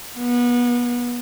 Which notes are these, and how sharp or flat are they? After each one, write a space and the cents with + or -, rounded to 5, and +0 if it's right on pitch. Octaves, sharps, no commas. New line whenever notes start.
B3 -30